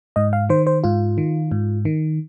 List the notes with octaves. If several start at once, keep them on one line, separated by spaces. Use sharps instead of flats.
G#2 D#5
F5
D#3 C5
C5
G#2 F4
D#3
G#2
D#3